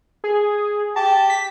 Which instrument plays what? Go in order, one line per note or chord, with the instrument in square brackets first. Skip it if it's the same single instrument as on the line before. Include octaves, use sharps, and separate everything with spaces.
[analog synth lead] G#4
[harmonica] G4 [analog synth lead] A5
[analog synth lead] B6